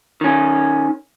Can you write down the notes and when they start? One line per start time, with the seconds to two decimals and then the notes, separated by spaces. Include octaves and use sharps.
0.21 D#3 C#4